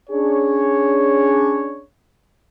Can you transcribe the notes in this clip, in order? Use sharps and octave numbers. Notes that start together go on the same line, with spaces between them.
C#4 D4 G#4 C#5